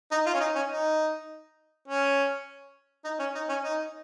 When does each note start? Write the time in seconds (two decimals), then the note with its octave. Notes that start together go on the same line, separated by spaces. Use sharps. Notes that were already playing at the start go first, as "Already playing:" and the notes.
0.11 D#4
0.26 F4
0.34 C#4
0.40 D#4
0.55 C#4
0.70 D#4
1.88 C#4
3.04 D#4
3.19 C#4
3.35 D#4
3.49 C#4
3.64 D#4